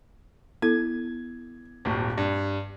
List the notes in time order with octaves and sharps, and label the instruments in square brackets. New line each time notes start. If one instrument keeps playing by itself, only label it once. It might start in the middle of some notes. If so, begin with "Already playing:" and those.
[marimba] B3 E4 A4 [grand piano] G#6
[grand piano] D#1 G#1
G2